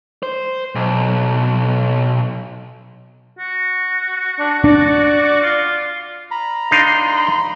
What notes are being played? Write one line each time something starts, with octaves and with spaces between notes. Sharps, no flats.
C5
B1
F#4
D4
D4 D5
F4
A#5 B5
D4 D#4 F5 C6